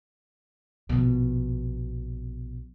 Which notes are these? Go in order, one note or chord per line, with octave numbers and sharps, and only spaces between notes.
A#1 B2